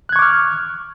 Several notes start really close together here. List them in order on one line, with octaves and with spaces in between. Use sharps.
F#6 G#6 C#6 D6 F6